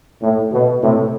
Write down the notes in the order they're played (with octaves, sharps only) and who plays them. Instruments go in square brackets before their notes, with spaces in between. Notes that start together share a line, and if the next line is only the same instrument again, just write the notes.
[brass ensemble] A2
B2
A2 C3